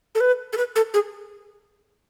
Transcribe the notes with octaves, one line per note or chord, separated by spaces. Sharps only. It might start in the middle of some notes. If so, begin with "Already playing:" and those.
A4
B4
A4
B4
A4
G#4